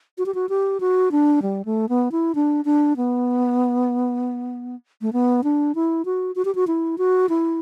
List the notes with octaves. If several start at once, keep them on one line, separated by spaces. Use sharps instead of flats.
F#4
G4
F#4
G4
F#4
D4
G3
A3
B3
E4
D4
D4
B3
A3
B3
D4
E4
F#4
F#4
G4
F#4
E4
F#4
E4